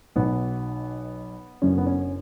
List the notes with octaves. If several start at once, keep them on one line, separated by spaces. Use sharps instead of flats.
B1 B2 B3
F#1 F#2 D3 C#4
B3
C#4